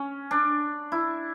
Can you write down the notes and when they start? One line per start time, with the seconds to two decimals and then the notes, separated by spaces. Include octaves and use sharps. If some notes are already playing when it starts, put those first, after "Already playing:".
Already playing: C#4
0.31 D4
0.92 E4